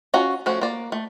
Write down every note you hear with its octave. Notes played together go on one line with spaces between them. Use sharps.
C#4 F4 F#4 A#5
F3 A3 C#4 F#4
A#3 D5
A3